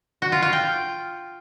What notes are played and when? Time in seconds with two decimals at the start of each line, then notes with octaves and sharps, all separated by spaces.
0.22 F#4
0.32 F4
0.42 F4
0.53 G5